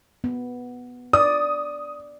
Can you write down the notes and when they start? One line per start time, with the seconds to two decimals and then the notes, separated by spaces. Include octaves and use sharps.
0.24 B3
1.13 D5 D#6